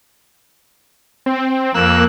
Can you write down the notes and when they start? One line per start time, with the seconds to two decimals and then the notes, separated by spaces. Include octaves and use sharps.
1.26 C4
1.74 F2 A#3 E6 F#6